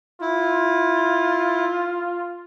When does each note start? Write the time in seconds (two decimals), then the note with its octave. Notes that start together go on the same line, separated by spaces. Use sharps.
0.21 E4 F4